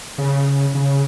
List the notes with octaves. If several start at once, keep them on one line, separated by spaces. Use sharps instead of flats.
C#3
C#3